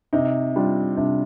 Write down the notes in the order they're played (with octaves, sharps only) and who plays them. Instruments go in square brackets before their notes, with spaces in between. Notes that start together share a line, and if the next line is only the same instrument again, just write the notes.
[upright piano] C3 [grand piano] D#4
[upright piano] G3 D4 F4
[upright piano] C3 [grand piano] D4